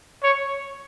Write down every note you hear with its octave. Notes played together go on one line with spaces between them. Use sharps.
C#5